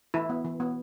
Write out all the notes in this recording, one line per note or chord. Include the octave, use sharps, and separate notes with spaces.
E3 E4
B3
E3
B3